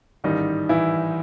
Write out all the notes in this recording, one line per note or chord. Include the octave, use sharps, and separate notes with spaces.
A1 G#2 D#3 G3 D#4
E3 E4